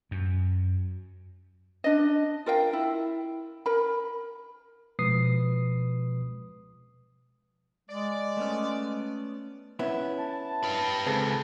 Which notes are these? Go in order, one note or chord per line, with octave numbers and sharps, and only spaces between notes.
F#2
D4 D#5
F4 A#4 F5 G5
E4
A#4 B5
B2 F3 G#3 B4 D#6 C7
G#3 D5
A3 B3 C#4
B3 C#4 E4
A5
G4 B4
C#2 C4 G#4 A4 B4